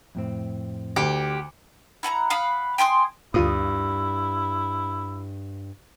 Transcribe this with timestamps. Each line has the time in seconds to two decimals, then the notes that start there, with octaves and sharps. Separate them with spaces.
0.15 F2 A2 C4
0.96 D2 G4
2.03 E4 F#5 G#5 A#5
2.30 F5 F#5 B5 D#6
2.78 G5 G#5 C6 D#6
3.34 D2 G2 E4 F4 D#6